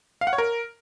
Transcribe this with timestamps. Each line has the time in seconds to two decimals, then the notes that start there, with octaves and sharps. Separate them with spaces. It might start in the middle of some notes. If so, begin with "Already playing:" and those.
0.21 F5
0.27 F#5
0.33 C#5
0.38 A#4